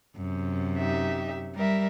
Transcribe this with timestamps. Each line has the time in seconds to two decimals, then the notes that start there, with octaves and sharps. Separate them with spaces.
0.17 F#2 C3
0.77 D#4 G4 E5
1.55 G3 A#4 E5